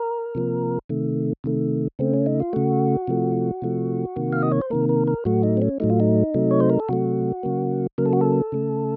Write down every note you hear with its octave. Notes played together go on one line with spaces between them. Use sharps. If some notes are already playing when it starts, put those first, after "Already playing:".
Already playing: A#4
C3 F3 A#3
C3 D#3 A3
C3 D#3 A3
C#3 A3 C4
C#4
D#4
F4
C#3 A3 F#4
C3 F3 A3
C3 F3 A3
C3 D#3 A#3
F5
D#5
C#5
C5
C3 D#3 A#3 A#4
A#4
A#4
A2 F#3 A3 F#4
D#4
C4
C#4
A2 F#3 A3 D#4
F4
D#4
C3 F#3 A3
C#5
C5
A#4
A4
C3 F#3 A3 F#4
C#3 F#3 A#3
C#3 F#3 A#3 A#4
A4
F#4
A4
C#3 A3